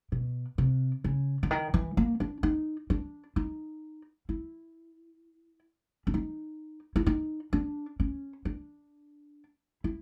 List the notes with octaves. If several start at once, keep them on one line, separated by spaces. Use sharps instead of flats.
B2
C3
C#3
D3
D#3
E3
A#3
D4
D#4
D4
D#4
E4
D4
D#4
E4
D#4
D4
C#4
D4
E4